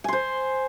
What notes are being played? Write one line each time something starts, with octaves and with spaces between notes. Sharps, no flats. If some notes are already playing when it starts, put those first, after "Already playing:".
C5 G#5 C6